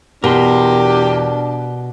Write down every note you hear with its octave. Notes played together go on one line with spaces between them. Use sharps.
E2 B2 D4 G4 A#4 C6